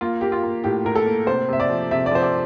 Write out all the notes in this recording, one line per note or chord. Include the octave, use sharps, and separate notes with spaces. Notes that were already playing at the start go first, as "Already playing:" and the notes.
A#3 F4
A#3 G4
F4
A#3
A2 G4
A2 A#4
A4
A#3
C3 C5
C3 E5
D5
F3
C3 E5
D5
F3 C5
D5